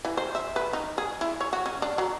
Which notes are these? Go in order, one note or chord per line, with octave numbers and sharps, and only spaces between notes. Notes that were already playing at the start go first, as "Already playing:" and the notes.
E3
C5
E5
B4
D#4
G#4
E4
C#5
F#4
C#4
D4
F#3